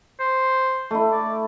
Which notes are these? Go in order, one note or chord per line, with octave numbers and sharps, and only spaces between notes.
C5
A3 E4
D5